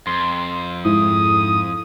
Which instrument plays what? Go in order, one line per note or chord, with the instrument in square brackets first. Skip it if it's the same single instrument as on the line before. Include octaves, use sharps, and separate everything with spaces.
[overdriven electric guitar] F2 [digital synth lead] C6
[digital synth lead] G#2 [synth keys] E4 [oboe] D#6